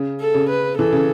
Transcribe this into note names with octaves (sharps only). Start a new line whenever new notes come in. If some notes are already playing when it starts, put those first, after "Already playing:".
Already playing: C#3
A4
C#3
B4
E3 A4
C#3